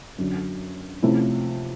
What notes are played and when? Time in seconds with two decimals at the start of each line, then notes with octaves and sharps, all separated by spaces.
0.18 F#2 D3 F#3
1.03 C3 F3 A3 C#4 E4